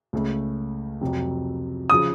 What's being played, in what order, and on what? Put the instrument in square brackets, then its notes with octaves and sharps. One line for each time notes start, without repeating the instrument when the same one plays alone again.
[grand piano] C#2 C#3 A3
F2 C3 F#3
C#3 F3 D#6